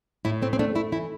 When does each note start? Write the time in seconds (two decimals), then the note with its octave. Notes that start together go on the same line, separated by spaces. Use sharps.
0.25 A2 E4
0.42 A3 C4
0.53 C4
0.59 A3 D4
0.75 A3 E4
0.92 E3 E4